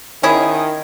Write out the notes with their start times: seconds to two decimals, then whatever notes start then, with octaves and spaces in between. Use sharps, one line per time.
0.23 D#3 C#4 E4 G#4